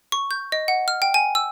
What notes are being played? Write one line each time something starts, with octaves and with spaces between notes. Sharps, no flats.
C#6
G6
D#5
F#5
F6
G5
G#5
E6